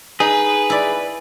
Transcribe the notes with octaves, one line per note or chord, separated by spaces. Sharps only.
D#4 G#4 B4
E4 D5